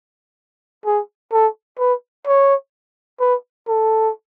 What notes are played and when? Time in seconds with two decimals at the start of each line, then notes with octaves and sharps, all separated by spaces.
0.86 G#4
1.33 A4
1.79 B4
2.27 C#5
3.20 B4
3.68 A4